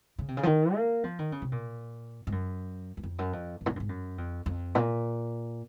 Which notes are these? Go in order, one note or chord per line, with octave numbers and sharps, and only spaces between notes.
C#3
C3
C#3
F3
D#3
A#3
F3
D#3
C#3
C3
A#2
G#2
F#2
F#2
F2
F#2
F2
F#2
A#2
G#2
F#2
G#2
F#2
F2
F2
A#2